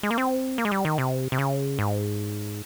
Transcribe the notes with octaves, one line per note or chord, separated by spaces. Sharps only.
G#3
A#3
C4
A#3
G#3
G3
D#3
C3
C3
C#3
G#2